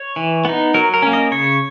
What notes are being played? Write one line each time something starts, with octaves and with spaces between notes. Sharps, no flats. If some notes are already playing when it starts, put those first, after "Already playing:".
Already playing: C#5
E3
B3 D#4
F#3 A#4
A#4
A#3 C#4
D#5
C#3 C#5